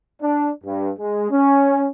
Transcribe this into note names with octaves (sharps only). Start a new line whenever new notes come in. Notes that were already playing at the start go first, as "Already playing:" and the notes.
D4
G2
G#3
C#4